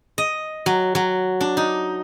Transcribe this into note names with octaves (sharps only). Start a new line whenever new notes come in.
D#5
F#3
F#3
D4
D#4